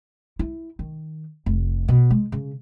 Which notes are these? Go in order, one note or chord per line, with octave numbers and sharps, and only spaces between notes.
E4
D#3
F1
B2
G#3
C#3